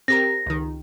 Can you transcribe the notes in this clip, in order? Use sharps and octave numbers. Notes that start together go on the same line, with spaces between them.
C4 G4 A#4 A#6
C#2 D#3